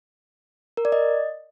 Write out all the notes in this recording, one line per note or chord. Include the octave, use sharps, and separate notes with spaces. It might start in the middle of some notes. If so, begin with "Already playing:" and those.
A#4
D5
D#5